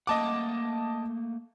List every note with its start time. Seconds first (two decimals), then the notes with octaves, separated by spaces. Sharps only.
0.07 A3 A#3 D#5 F#5 A5 D6